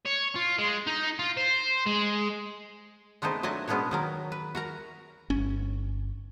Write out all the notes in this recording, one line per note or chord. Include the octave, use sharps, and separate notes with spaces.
C#5
F4
G#3
D#4
F4
C5
G#3
G#3 A3 B3 C4 D#4
F#3 A3 D4 D#5 G#5
B2 G#3 B3 C#4 D4 C#5
D#3 F#3 A#4
B4
F#4 A#4 A#5
G1 C#4